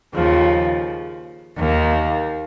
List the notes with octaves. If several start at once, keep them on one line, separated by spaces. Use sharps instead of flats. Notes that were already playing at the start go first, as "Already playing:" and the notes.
D#2 C#3 F3
D#2 D#3 A#3